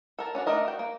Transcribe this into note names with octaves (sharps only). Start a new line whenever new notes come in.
A4 A#4 A5
C#4 D4 F#4
A3 D4 A4 A#4 D#5
F#4 G5
A#3